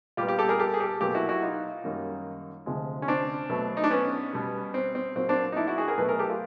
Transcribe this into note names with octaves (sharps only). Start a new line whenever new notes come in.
A#2 G3 B3 F4 G4
F4 G4
G4 A4
G#4 A#4
G4 A4
G#4
G4 A4
B2 F#3 A#3 F4 G4
E4 F#4
E4 F#4
D#4 F4
F#2 D#3 G3 A#3
D2 C3 F3 G#3
C#4
C4 D4
B2 F#3 A3
D#4
D4
B3 C#4
B2 G3 B3
C4
C4
A#2 F#3 A#3 C4
C4 D4
D#4
D4 E4
E4 F#4
F#4 G#4
G#4 A#4
B2 F#3 A3 A4 B4
G#4 A#4
G4 A4
F4 G4